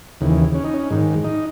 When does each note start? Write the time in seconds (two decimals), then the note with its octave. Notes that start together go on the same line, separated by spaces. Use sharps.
0.21 D#2 C#3 E3
0.54 C#4
0.65 D#4
0.74 C#4
0.91 G#2 D#3
1.24 D#4